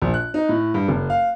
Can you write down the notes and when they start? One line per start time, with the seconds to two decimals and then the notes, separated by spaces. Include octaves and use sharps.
0.02 A#1
0.14 F#6
0.34 D#4
0.49 A2
0.74 G2
0.88 F#1
1.10 F5